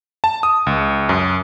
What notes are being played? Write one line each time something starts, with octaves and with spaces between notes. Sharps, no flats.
A5
D#6
C#2
F#2